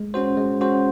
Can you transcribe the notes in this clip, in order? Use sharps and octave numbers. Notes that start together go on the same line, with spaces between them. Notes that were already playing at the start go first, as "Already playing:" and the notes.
Already playing: G#3
C#4 F#4 C5
G#3
C#4 F#4 C5